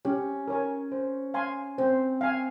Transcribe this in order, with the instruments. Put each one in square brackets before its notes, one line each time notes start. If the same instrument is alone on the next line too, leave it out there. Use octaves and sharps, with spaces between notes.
[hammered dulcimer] C#4 [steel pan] G4
[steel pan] A#4 C#5 G#5
C5
F5 G#5 C6
[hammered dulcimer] C4 [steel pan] C5
[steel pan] F5 G#5